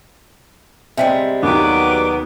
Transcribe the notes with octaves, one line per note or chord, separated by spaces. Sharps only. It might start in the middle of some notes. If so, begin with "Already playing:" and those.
C3 G3 G#3 E5 G5 B6
D#2 F#3 B3 D6